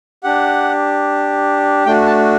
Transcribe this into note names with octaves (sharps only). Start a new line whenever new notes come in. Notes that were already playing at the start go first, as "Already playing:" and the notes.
D4 G4 F#5
A3 D4 F#4 G5
A5